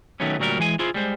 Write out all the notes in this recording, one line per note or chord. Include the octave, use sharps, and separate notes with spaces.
D#3 F#3 A3 B3 C#4
D2 A#2 F#3 G3 F#4 A#4
E3 G#3 G#4 G#5
E4 F4 G#4 C5
G3 G#3 C5